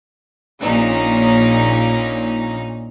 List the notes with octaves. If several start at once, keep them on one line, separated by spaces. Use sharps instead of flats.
A#1 A#2 C#4 D#4